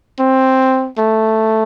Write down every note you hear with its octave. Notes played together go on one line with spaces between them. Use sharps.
C4
A3